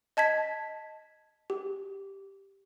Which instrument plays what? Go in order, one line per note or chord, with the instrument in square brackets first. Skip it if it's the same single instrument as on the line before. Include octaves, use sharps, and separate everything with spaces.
[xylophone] D#5 A5 G#6 B6
G4